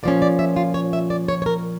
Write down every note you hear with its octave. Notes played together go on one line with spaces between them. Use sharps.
A#2 F3 C#4 D5
D5
E5
F4
C#5
E5
D5
C#5
C#5
A#4